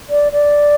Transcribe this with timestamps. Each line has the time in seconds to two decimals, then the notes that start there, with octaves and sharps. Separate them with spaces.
0.10 D5
0.32 D5